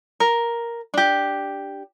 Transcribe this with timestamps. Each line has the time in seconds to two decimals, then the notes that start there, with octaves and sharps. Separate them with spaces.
0.20 A#4
0.94 D4 G4